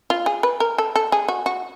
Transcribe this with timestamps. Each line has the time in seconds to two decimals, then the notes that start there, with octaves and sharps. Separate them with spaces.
0.10 F4
0.26 G#4
0.43 B4
0.60 A#4
0.78 A4
0.96 A4
1.12 G#4
1.28 F#4
1.46 F#4